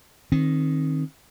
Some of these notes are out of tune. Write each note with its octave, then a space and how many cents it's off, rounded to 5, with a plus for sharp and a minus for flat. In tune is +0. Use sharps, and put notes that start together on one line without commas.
D#3 +0 C4 +30